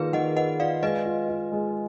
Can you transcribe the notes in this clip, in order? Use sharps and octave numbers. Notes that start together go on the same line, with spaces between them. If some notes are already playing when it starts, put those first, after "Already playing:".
Already playing: D#3 A#3 F4 G#4 A#4 B4 D5
D#3 D#5 F#5
B4 D#5 F#5
F4 D5 F5
G#3 B4 D#5
F4
F4
G#3